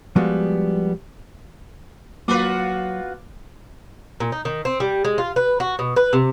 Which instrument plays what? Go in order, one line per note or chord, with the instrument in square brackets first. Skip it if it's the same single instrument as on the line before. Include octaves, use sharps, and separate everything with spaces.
[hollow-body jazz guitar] F3 G3 G#3 B3 F#4
[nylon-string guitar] F#3 [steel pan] A#3 [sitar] F4 F#4 B4 [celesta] D6
[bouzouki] A#2
D#4
D#3
C4
G3
G#3
F4
B4
F#4
B2
B4
C3